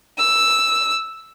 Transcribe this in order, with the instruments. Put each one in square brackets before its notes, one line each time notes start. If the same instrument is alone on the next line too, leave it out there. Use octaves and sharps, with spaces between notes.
[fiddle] E6